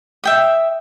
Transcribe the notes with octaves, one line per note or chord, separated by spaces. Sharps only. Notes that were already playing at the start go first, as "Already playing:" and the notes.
E5 G5 D#6